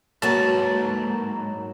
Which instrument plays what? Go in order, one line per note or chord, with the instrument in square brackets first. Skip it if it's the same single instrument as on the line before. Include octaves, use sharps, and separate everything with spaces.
[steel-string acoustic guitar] D2 A#3 B4 [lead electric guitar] G#2 [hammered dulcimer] F#3 [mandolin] A5